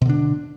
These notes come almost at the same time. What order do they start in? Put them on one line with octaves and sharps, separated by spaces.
B2 D3 D4